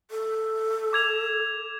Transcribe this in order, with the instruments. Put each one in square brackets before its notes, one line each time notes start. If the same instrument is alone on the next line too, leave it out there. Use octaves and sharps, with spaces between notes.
[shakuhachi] A4
[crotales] D6 G#6 F7